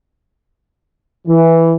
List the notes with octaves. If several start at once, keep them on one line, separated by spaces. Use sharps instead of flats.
E3